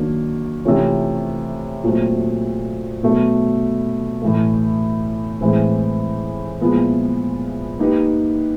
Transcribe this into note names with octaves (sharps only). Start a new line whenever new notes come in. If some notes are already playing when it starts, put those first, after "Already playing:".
Already playing: D#3 F#3 A#3 D4
C3 E3 A3 C#4 F4
A#2 F#3 A3 C4
B2 F#3 A3
A2 E3 A3
A2 E3 G#3 C4
A#2 F3 G#3 B3 E4
A#3 D#4 G4 B4